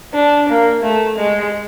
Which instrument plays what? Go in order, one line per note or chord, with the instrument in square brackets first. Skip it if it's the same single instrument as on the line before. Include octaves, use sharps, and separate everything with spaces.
[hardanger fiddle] D4
A#3
A3
G#3